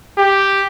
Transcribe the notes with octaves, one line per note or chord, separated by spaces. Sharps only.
G4